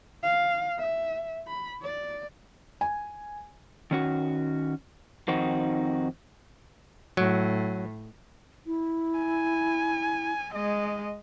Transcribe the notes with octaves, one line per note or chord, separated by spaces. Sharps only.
F5
E5
B5
D5
G#5
D#3 C#4 F#4
F2 D#3 C4 D#4 F#4
A2 F#3
E4
G#5
G#3 D#5